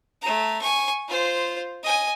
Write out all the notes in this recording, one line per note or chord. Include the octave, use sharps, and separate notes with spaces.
A3 A#5
G#5 C#6
F4 C5
D#5 G#5